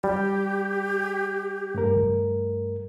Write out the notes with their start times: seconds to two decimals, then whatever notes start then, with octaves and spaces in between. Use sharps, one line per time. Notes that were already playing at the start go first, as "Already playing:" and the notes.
0.04 G3 G4
1.75 G2 A3 A#4